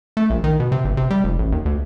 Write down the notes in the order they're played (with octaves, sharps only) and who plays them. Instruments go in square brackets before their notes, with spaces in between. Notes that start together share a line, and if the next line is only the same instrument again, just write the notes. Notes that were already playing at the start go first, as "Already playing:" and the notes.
[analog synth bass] A3
A#1
D#3
B2
C3
G1
C3
G3
F1
A1
D#2
D2